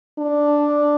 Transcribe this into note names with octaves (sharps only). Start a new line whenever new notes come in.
D4